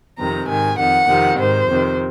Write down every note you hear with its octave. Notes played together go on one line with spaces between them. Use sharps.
F2 C3 D#3 A#5
G#2 D#3 G#5
F2 D#3 F#5
F2 C3 D#3
G#2 D#3 C5
F2 C3 D#3